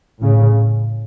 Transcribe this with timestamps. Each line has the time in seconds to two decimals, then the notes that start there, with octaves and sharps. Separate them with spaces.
0.21 A2 C#3